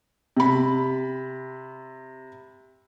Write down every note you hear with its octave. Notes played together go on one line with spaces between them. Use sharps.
C3 B5